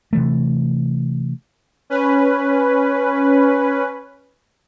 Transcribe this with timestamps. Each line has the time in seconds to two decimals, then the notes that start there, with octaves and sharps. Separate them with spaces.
0.13 C3 E3 A3
1.90 C#4 B4